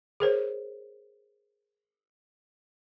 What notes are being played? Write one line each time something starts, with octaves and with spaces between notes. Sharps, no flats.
G#4 A#4 C5 C#5